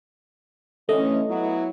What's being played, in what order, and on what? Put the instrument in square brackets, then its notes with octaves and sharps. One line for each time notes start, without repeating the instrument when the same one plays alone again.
[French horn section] D3 E3 C#4 [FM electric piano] A3 D#5
[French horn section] F#3 B3 E4